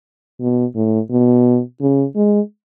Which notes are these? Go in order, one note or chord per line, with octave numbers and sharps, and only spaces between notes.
B2
A2
B2
C#3
G#3